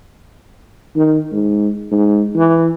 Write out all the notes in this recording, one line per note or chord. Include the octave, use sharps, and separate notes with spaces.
D#3
G#2
G#2
E3